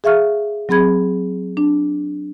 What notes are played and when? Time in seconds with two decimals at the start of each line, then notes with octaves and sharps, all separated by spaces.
0.04 G#4 E5 F5 C#6 F6
0.69 F#3 C4 G#4 B5 G#6
1.57 D4